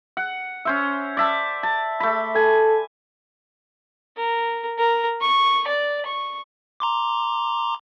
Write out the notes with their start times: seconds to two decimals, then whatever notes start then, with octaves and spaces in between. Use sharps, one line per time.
0.17 F#5
0.65 C#4 C5 E5
1.17 D5 E5 A5
1.63 A5
2.00 A3 B5
2.35 A4 G#5
4.17 A#4
4.78 A#4
5.21 C#6
5.67 D5
6.06 C#6
6.80 A#5 C6 D6